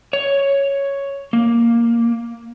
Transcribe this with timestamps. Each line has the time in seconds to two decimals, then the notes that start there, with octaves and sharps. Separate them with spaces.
0.13 C#5
1.33 A#3